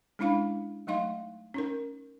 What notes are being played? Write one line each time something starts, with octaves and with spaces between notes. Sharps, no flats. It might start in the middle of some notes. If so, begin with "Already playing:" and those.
G#3 C#4 D4 E4 F5 B5
F#3 A3 D#4 D#5 F5 C6
C#4 D#4 A#4